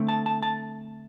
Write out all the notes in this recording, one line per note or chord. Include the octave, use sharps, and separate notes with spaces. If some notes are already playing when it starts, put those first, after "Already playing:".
Already playing: D3 A3 C4
A5
A5
A5